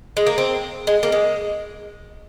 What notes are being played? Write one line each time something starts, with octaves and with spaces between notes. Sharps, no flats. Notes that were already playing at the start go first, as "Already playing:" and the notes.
G#3
A#3
C4
G#3
A#3
G#3